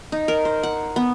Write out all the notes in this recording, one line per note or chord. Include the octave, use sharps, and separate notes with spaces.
D#4
A#4
C5
F#5
B3